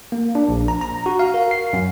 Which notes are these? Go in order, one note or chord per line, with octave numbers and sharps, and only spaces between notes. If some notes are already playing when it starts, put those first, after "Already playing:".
A#3
D4
A#1
A#5
A#5
F#4
F5
A#4
C7
F#2